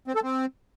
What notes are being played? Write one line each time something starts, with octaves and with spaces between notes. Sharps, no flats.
C4
A4
C4